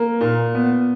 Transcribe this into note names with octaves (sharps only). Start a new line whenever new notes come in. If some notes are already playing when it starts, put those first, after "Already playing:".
Already playing: A#3
A#2
B3